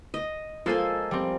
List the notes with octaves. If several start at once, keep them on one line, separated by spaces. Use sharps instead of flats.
D#5
G#3 A#3 F4 A4 C5 G#5
G3 C4